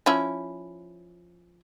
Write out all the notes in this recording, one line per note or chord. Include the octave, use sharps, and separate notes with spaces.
F3 C#4 E4